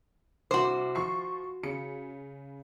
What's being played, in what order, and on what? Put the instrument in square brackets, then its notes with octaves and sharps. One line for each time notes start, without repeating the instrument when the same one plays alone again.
[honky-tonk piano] C2 D6 [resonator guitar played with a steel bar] F#4 C5
[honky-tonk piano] F3 C#6 C7
C#3 C#7